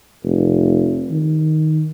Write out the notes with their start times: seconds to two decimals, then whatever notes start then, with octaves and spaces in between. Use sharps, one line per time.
0.24 F1
1.11 D#3